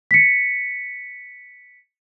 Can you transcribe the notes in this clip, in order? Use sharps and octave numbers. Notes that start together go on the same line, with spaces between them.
B6 C#7